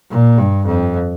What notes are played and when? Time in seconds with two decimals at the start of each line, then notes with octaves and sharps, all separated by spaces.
0.10 A#2
0.38 G2
0.66 F2